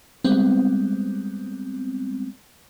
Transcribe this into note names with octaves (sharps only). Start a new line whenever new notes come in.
G3 G#3 B3 C4